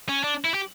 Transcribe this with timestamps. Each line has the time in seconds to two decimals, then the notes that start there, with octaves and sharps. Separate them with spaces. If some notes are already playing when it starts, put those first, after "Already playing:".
0.09 C#4
0.24 D4
0.45 E4
0.54 G4